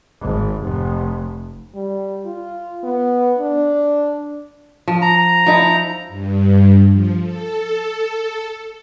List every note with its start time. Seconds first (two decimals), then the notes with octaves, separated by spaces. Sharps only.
0.22 G#1
0.62 F1
1.74 G3
2.26 F4
2.83 B3
3.39 D4
4.88 F3
5.02 A#5
5.46 F3 D#4 E4
6.08 G2
6.90 F3
7.21 A4